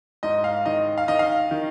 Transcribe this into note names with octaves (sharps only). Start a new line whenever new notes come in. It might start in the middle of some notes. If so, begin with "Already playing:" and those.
G#2 D#5
F5
D#3 D#5
F5
D#3 D#5
F5
D#3